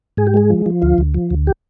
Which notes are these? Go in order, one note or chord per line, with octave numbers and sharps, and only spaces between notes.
G#2 G#4
G4
G#3 G#4
F3
F3
D2 F4
D2
F3
D2
G4